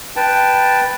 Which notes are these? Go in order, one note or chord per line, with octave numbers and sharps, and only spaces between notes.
B4 G5 A5